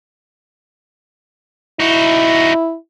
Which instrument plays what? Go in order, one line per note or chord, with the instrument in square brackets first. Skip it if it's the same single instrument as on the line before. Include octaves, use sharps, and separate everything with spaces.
[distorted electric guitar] D#4 F#4 [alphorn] E4